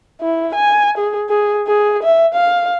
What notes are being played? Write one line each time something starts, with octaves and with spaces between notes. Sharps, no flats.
E4
G#5
G#4
G#4
G#4
E5
F5